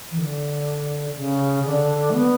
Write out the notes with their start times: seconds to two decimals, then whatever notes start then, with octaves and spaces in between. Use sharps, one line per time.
0.11 E3
0.18 D3
1.16 C#3
1.65 D3
2.10 A3
2.14 B3